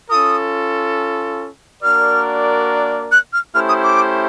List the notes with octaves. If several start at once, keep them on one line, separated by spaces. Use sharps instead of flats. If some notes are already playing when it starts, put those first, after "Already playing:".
C#4 F4 A4 D#6
A#3 D4 F#4 A#4 D5 F6
F#6
F6
A3 C#4 E4 G4 C5 F6
D#6
D6